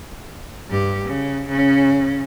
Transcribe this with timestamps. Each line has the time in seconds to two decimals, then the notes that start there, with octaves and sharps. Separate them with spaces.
0.69 G2 G4
1.05 C#3
1.48 C#3 C#4